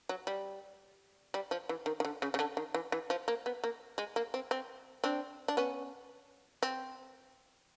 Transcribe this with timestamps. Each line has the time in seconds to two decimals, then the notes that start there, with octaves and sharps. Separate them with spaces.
0.09 F#3
0.27 G3
1.34 G3
1.51 F3
1.69 E3
1.86 D#3
2.00 D#3
2.05 D3
2.22 C#3
2.34 C#3
2.39 D3
2.57 D#3
2.74 E3
2.92 E3
3.10 F3
3.28 A#3
3.46 B3
3.64 A#3
3.98 G#3
4.16 A#3
4.34 C4
4.51 C4
5.04 C4 D4
5.48 D4
5.57 B3 C#4
6.63 C4